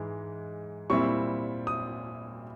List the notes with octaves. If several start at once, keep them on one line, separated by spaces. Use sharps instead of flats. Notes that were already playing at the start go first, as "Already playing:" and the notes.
Already playing: G#2 E3 G#3
A#2 G3 C4 E4 C#6
D#6